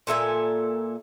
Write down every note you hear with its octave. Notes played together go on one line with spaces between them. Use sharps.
A#2 A4 E5 G#5